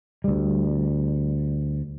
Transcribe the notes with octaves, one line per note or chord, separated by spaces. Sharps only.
D2 G3